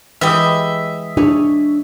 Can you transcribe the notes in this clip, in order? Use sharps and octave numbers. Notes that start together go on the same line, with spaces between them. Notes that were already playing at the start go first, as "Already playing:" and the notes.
E3 G#3 G4 D#5 E5
D4 G#4 C#5